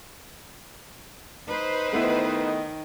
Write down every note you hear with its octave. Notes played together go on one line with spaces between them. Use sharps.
D#4 B4 C5
D#3 A3 B3 E4